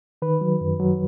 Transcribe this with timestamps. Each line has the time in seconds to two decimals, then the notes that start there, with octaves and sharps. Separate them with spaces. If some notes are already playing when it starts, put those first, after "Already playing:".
0.22 D#3 B4
0.41 F#3
0.61 F#2
0.80 F#3